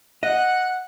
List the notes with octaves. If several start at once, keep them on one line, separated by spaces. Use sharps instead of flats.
D#5 F#5 F#6